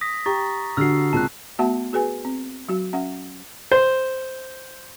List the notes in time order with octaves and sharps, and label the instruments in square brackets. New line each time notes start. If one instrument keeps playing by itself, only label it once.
[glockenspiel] D#6 A#6 B6
[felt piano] G4 [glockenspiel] A#5 C#6 A6
[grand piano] D3 F#4 [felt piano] G4 F6 [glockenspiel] E6 C7
[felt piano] C#2 A#2 C4 [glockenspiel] A5 F#6
[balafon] A3 B3 F#4 E5 F#5 A5
F#4 G#4 B4 G#5
C4
F#3 F#4
C#4 E5 F#5
[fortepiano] C5